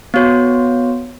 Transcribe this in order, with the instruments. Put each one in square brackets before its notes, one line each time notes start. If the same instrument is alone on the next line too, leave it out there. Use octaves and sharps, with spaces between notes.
[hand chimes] B3 F#4 C#5